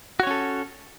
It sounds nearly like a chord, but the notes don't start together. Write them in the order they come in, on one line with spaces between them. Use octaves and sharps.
F#4 C#5 C#4 A4